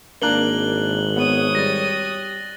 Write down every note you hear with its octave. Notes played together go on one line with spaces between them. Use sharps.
G#1 A#3 D4 A#4 F#6 F#7 G7
B3 C#5 D#6
G3 A6 A#6